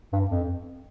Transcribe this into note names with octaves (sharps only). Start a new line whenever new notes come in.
G2
F2